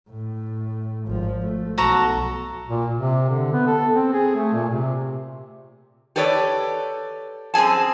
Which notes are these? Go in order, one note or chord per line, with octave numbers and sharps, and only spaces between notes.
A2
G#1 F3
A3
B1 F#4 A4 A#5
A#2
C3
D3
B3
A4
C4
G#4
A3
A#2
C3
G4 A4 B4 C#5 D5
F#2 C4 G#4 G#5 A5